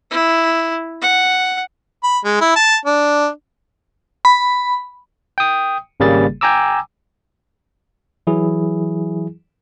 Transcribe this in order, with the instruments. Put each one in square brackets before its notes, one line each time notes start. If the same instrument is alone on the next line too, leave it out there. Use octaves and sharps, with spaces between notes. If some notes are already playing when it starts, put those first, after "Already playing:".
[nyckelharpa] E4
F#5
[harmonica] B5
G#3
E4
A5
D4
[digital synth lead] B5
[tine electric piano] G5 D#6
G#1 C#3 G3 A#3 G#4 A6
G5 G#5 A#5 D6 E6
E3 F#3 E4 G#4